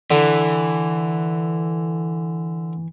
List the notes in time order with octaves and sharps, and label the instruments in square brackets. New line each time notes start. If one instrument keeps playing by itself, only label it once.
[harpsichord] D3 [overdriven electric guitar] E3